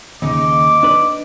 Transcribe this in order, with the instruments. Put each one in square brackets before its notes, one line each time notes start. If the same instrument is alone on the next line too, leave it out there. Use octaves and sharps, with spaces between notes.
[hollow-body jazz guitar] D#2 C#3 [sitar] D#4 [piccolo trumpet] D6
[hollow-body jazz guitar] D4 B4